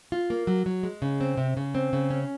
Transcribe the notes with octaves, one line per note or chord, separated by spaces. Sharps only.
F4
A#3
F#3
F#3
G#3
C#3
C4
C3
C#3
C4
C#3
C#4